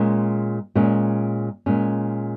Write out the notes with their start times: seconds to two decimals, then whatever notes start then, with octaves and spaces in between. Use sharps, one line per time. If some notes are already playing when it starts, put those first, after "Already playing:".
Already playing: A#2 G#3 C#4
0.75 A#2 G#3 C#4
1.66 A#2 G#3 C#4